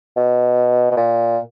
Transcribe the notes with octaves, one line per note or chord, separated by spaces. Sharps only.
B2
B2
A#2